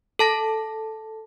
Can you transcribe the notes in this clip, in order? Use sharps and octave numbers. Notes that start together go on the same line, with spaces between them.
A4 A5 A#6